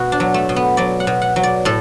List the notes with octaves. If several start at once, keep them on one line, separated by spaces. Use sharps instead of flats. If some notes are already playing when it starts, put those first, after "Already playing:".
Already playing: B2 F#4
D4
F#3
A3
B2
B3
F#3 D5
F#5
B2
F#5
F#3
D5
A2 A4